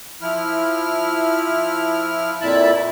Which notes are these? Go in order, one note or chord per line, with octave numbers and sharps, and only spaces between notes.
F3 E4 F6
F2 A#2 E4 E5 A5 B5